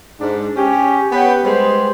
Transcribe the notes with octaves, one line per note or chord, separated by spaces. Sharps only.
G#2 D4
C#4 G4
B3 G4 B4 C#5 F#5 G5
G3 G#3 G#4 B4 C5